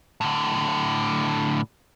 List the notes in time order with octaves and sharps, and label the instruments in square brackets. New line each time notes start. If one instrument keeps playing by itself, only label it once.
[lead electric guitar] A2 D3